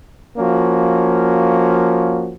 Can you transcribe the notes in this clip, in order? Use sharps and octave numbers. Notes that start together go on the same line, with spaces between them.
F3 A#3 C#4 F#4